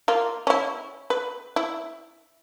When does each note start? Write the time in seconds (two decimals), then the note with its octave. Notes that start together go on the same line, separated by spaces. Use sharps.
0.08 A#3 F4
0.47 C#4 E4
1.10 B4
1.56 E4